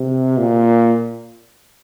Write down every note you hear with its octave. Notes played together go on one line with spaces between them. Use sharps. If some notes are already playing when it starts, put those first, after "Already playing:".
Already playing: C3
A#2